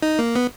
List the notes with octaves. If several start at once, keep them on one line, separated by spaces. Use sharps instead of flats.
D#4
A#3
B3